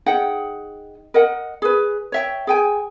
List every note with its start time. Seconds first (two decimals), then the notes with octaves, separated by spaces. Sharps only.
0.06 D#4 G#4 F#5 G5
1.14 A#4 D#5 F#5
1.62 G#4 B4
2.12 C#5 E5 G5
2.47 G#4 G5 G#5